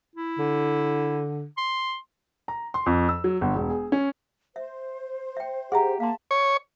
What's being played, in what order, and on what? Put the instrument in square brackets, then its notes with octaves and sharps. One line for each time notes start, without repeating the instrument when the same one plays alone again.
[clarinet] E4
[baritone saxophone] D3
[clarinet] C6
[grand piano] A#5
C6
F2
E6
F#3
G1
E1
G#4
C#4
[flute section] C5 [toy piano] E5
[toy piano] E5 G5
[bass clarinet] G4 [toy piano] G#4 E5 [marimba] F#5 A#5
[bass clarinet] A#3 [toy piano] F5 C6 [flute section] A5
[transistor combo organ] C#5